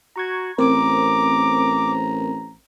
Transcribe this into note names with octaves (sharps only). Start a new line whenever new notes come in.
F#4 A#5 C#6 G#6
A1 C4 A#4 C5 A#5 D6